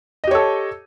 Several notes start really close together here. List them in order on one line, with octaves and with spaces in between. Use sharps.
D#5 G4 C#5 A4